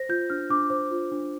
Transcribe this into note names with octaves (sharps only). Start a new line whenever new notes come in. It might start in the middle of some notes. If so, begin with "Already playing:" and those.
Already playing: C5 A#6
F4 G6
D4 F6
D4 D6
C5 D6
F4
D4